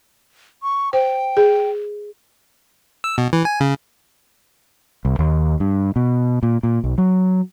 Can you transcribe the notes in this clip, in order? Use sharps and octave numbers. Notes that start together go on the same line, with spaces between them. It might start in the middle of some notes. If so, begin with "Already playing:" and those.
C#6
C5 G5
G#4
E6
B2
E3
G#5
C#3
C2
D#2
G2
B2
A#2
A#2
B1
F#3